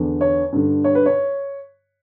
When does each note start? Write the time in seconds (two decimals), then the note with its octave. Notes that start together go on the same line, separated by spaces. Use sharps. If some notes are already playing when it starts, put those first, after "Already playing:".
Already playing: E2 D3
0.21 C#5
0.52 G2 D3
0.84 C#5
0.95 B4
1.06 C#5